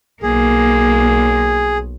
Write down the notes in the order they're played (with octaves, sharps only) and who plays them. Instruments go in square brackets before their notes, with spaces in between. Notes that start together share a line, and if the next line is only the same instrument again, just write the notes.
[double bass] B1 [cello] A#3 [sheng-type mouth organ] G#4